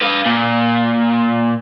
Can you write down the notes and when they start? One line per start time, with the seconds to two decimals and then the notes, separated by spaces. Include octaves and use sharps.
0.02 B4 F5
0.26 A#2